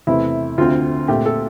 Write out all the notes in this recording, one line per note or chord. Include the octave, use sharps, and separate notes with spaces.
E2 C3 E3 A3 E4
D2 D3 A3 C4 F4
A#2 A3 C4 G4
A4